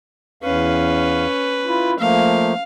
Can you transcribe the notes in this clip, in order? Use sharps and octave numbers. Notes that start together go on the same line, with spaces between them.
E2 C#4 B4 F5
E4 F4
F3 A3 A#3 F5